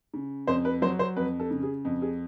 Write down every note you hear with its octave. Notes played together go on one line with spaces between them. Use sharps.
C#3
F2 C5
B4
F#3 C5
C5
F2 B4
A4
C#3
G#4
F2
G#4